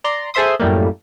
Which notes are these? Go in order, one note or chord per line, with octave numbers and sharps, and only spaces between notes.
D5 A#5 C6
G#4 A4 C5 E5 C6 D#6
F#2 A2 G3 A3 A#3